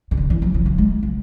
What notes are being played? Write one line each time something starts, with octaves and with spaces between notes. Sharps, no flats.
C#3
D#3
E3
F#3
E3
F#3
G#3
F#3